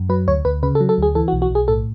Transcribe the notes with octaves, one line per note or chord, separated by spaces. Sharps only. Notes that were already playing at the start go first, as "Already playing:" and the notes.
Already playing: F#2
F#3 B4
D2 C#5
D2 B4
C#3 B4
A4
F#3
A4
D2 G#4
E3 A4
F#4
B1
F#4
B1 G#4
A2 A4